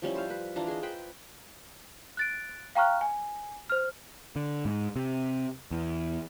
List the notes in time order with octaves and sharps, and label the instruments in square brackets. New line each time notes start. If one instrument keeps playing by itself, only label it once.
[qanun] F3 G3 C#4 E4
C5 F5
B4
E3 D4 F4 A#5
G#4 D#5
B4 C5 G5 B5
[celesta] F#6 A6 D7
F5 G5 A#5 C#6 F6 F#6
G#5
C5 F6
[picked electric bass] D3
G#2
C3
E2